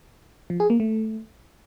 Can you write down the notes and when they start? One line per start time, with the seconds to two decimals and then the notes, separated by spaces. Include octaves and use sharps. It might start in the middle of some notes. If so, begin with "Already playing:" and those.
0.50 F3
0.60 G#4
0.70 A#3
0.80 A3